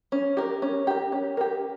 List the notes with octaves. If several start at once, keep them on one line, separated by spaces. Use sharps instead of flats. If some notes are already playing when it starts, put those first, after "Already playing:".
C#4
G4 A#4
C#4
G4 A#4
C#4
G4 A#4